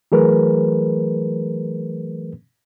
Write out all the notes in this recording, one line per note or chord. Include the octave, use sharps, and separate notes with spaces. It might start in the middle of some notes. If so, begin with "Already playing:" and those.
E3 F#3 A3 G#4 A#4 B4